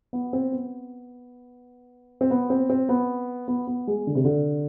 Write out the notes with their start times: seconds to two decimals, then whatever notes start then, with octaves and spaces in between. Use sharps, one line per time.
0.13 B3
0.33 C4
0.52 B3
2.21 C4
2.30 B3
2.50 C4
2.70 C4
2.89 B3
3.48 B3
3.67 B3
3.87 G#3
4.07 D3
4.15 C3
4.25 D3